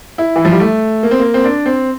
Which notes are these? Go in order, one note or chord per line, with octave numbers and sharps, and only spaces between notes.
E4
E3
F3
G3
A3
A#3
C4
A#3
C4
D4
C4